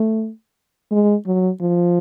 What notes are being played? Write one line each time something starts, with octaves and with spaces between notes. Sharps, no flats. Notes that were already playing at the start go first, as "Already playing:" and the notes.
Already playing: A3
G#3
F#3
F3